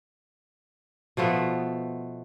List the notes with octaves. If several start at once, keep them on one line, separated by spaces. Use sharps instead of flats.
B2 F3 A3 B3